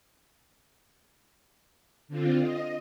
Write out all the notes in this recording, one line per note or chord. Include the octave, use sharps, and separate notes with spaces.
D3 C4 F4
D#5